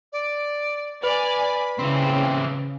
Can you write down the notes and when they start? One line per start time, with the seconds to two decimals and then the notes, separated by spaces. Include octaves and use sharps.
0.13 D5
1.03 B4 D5 G#5 B5
1.79 C#3 E3 C4